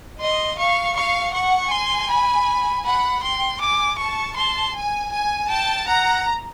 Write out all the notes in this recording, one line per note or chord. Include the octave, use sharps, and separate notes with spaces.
D#5 C6
F5 C#6
F5 C#6
F#5 C#6
G#5 C6
B5
F#5 B5
G5 C6
G#5 D6
A5 C#6
A5 C6
G#5
G#5
G5 A5
F#5 A#5